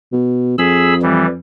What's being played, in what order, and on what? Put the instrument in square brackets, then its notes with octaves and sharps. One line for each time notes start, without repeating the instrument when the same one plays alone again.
[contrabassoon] B2
[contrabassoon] F2 [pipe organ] G#4 B5 E6
[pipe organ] E3 G3